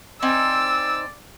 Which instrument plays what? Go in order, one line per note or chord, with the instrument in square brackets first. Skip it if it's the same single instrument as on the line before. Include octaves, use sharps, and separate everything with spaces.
[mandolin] C4 D#4 G#5 [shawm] D5 [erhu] E6